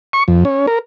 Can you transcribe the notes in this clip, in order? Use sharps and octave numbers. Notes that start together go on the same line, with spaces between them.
C#6
F2
C#4
A#4